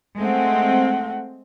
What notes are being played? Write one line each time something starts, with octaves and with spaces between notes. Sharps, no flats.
G#3 A3 C4 F#5